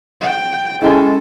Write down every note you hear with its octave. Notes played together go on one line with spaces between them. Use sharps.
G5
G#3 C#4 E4 A4 G5 G#5